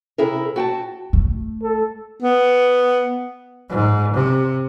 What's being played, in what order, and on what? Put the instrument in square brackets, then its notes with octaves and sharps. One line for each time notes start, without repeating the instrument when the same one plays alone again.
[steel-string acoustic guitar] C3 E4 G#4 A#4
F#4 G5 A5
[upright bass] A3
[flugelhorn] A4
[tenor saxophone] B3
[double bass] G#2
C3